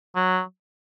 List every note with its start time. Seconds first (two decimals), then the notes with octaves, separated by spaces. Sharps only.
0.15 F#3